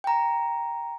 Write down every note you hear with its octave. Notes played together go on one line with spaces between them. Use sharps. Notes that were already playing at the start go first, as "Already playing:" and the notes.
G5 A#5